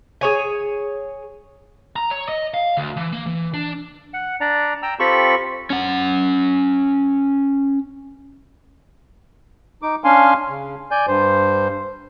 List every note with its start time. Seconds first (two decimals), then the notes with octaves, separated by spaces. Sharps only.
0.21 G#4 C#5 G#5
1.96 A#5
2.11 C#5
2.29 D#5
2.54 F5
2.77 D2
2.97 E3
3.12 A#3
3.26 E3
3.54 D4
4.14 F#5
4.41 D4 D5 A#5
4.83 G5 A#5 E6
4.99 C4 F4 G4 A4 B5 C#6
5.70 C#4 F#5
9.82 D#4 D6
10.04 C#4 D4 F5 G#5 C6
10.49 C#3
10.91 D5 G#5 G6
11.07 G2 C5